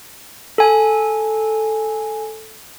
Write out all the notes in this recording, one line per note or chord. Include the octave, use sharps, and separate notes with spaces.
A4 G#5